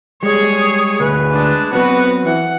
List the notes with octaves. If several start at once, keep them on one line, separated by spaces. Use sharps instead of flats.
G3 G#3 G#4 C#5
D2 G#4 B4
G#3 D4
F#3 B3 C4 F#4 B4
E3 F#5